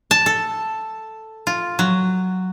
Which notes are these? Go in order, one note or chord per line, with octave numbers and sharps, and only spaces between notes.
A5
A4
F4
F#3